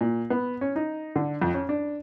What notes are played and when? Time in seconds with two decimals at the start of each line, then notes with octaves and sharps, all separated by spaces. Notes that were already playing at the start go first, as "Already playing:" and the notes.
0.01 A#2
0.30 B3
0.61 C#4
0.76 D#4
1.16 D3
1.42 F2
1.54 C#4
1.69 D4